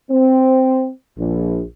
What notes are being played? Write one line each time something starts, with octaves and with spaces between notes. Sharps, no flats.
C4
A#1